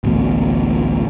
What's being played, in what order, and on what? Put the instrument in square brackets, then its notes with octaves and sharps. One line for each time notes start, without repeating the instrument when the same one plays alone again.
[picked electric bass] A1 D2 B2